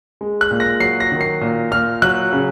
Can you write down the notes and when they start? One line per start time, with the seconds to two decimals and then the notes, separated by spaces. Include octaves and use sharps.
0.21 G#3
0.41 F#6
0.51 A#2
0.60 A#6
0.80 F#3 C7
1.00 A#6
1.12 D#3
1.21 C7
1.41 A#2
1.71 A#2 F6
2.02 F#3 F#6
2.33 C#3